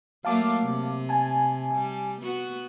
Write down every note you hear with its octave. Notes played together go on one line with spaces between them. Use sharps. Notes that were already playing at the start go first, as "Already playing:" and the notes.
F#3 A3 A#3 F5 A5 D6
C3
G#5 A5
G3
B3 F#4